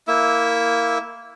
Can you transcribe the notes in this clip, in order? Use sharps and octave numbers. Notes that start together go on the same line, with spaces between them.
A#3 E4 E5